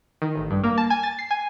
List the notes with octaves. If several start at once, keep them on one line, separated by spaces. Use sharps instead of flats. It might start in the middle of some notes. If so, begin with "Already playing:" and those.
D#3
A1
G2
A#3
A5
G#5
A6
C7
G#5